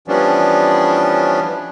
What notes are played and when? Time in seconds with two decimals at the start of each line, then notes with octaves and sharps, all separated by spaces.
0.08 E3 F3 G3 B3 C#4 D4